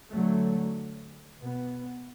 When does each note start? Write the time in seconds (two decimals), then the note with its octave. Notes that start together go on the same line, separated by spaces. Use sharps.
0.12 D3 F#3 A3
1.40 B2 B3